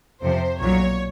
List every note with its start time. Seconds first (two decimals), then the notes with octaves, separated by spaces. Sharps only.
0.21 F2 C3 F3 C5
0.59 B1 A#2 F#3 C#5